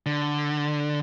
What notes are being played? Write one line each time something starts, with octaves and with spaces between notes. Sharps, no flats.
D3